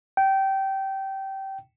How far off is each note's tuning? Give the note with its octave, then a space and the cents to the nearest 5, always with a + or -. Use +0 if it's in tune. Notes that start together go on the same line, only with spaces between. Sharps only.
G5 -20